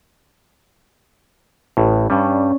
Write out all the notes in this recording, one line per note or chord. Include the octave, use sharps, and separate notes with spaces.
A1 A2
G2 G3 C#4 D4